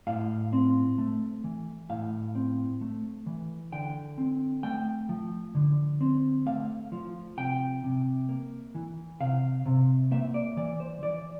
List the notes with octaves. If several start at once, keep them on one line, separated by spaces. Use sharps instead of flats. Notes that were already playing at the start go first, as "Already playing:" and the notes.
A2 F5
C4
A3
E3
A2 F5
C4
A3
E3
D3 G5
C4
A3 G5
F3
D3
C4
A3 F5
F3
C3 G5
C3
A#3
E3
C3 F5
C3
A#3 E5
D5
E3 D5
C5
E3 D5